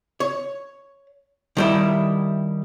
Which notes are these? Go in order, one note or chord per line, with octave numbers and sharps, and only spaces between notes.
C#5
D#3 G3 E4